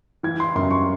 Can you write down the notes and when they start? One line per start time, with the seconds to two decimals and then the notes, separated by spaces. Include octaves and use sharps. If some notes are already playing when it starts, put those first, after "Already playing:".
0.23 E3 G#6
0.40 C6
0.55 F#2 C6
0.71 C#6